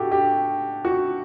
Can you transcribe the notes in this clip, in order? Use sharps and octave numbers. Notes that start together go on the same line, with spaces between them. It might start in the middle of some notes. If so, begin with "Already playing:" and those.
Already playing: A2 F#4 G4 A4
G4
F#4